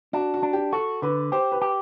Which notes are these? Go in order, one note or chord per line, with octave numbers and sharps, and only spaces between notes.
D4 F#4
F#4
D4
G4
F#4 A4
D3 B4
G4 C5
B4
G4